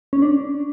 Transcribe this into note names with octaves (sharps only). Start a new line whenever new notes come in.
C#4
D4